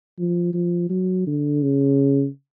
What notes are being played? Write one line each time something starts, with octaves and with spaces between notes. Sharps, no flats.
F3
F3
F#3
D3
C#3